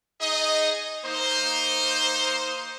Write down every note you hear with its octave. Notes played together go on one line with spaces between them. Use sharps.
D#4 G#4 D#5
A#3 D#4 C5